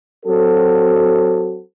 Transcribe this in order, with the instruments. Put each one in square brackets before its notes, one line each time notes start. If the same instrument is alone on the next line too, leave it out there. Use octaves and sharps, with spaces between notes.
[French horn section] F#3 C4 F#4 A4